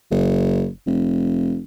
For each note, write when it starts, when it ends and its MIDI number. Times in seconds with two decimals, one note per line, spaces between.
0.11 0.68 30
0.87 1.60 29